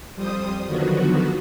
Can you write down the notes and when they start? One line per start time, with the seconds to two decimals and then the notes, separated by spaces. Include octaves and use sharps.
0.15 F2 G3 C5 D#6
0.67 D3 D#3 F3 F#3 B3 F#4